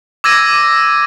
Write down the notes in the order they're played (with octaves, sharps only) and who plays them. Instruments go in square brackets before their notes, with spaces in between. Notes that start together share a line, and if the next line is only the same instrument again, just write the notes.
[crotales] D6 E6 G#6 A#6 D#7